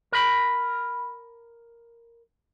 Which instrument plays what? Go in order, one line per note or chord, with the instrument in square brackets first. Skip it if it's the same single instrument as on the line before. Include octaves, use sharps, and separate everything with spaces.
[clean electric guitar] A#4 B5